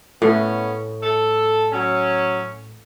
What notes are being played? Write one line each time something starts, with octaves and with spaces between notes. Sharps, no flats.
A2 B3 C#4
A4
F#3 C#4